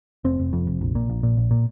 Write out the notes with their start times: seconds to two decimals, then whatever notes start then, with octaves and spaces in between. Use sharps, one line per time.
0.24 F1 C4
0.40 F1
0.53 F2
0.67 F1
0.81 A#1
0.95 A#2
1.09 A#1
1.23 A#2
1.37 A#1
1.51 A#2